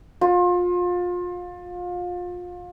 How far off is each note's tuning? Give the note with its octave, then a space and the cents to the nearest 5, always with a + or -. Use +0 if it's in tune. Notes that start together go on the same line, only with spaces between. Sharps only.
F4 +30